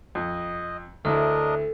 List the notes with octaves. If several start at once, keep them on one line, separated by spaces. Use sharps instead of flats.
F2 D#5
D2 D4 E4 A4 A#4 D#5